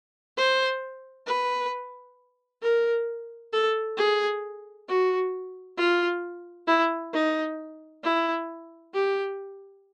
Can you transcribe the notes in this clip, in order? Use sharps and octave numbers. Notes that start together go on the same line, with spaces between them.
C5
B4
A#4
A4
G#4
F#4
F4
E4
D#4
E4
G4